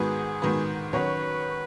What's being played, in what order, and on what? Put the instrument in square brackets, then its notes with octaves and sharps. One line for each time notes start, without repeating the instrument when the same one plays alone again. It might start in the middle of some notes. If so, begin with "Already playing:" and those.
Already playing: [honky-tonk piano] G#2 D#3 B3 F#4 B4 [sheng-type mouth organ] G#4
[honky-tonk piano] G#2 D#3 B3 F#4 B4
[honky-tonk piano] D#3 F#3 C#4 F#4 C#5 [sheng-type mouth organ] B4